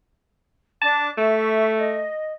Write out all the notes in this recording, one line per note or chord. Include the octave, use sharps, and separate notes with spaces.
D4 A5 D6
A3 E5 C#6
D#5